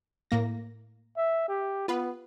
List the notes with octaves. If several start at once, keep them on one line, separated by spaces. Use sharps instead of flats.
A2 A#3 A#6
E5
G4
B3 F4 B4